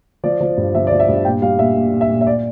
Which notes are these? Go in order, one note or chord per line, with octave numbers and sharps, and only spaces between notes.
F3 D5
F3
G2
F3 E5
D5
F3
E5
G2
A#2 G5
G3 F5
A#2 E5
A#2
A#2
E5
A#2
E5
D5